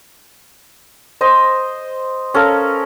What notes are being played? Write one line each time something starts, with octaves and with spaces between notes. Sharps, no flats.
C5 D#5 C6
C#4 A4 A#4 F5